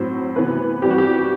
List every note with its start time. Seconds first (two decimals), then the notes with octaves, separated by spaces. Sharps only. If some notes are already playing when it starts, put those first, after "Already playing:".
Already playing: A2 F#3 C4 C5
0.36 C3 E3 B3 B4
0.82 E3 G3 C4 G4
0.90 F#4
0.98 G4